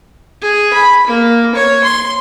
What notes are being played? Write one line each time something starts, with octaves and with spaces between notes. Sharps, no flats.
G#4
B5
A#3
C#5
C6